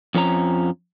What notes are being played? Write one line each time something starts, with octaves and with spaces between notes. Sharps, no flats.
F2 F3 C#4 A#5